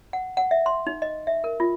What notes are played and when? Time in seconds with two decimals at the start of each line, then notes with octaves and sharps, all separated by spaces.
0.13 F#5
0.37 F#5
0.51 E5
0.66 C6
0.87 D#4
1.02 D#5
1.27 E5
1.44 A#4
1.60 F4